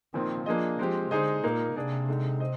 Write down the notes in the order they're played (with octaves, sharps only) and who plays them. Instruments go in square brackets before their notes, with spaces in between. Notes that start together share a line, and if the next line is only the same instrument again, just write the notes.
[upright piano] A#2 F3 C4 [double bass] D#3
[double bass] F3 [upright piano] A#3 D4 G#4 D#5
[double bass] F3 [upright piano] G#3 C4 G4
[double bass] D3 [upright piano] G#3 D#4 G#4 C5 D#5
[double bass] A#2 [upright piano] A#3 D#4 A#4
[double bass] C3 [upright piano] A#3 D4 G#4 D5
[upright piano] D3 G#3 D#4
C5 D#5